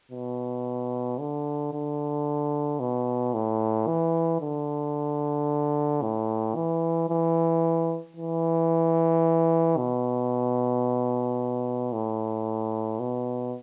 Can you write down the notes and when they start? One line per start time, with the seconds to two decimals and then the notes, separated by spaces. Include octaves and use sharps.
0.11 B2
1.20 D3
1.73 D3
2.80 B2
3.34 A2
3.87 E3
4.41 D3
6.02 A2
6.55 E3
7.09 E3
8.16 E3
9.77 B2
11.92 A2
12.99 B2